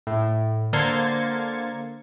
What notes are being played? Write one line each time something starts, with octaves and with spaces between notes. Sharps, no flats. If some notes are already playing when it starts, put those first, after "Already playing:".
A2
D3 A#3 C5 G#6 A6 C#7